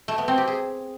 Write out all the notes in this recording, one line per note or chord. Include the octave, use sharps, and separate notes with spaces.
A3
B3
C4
G4
G#4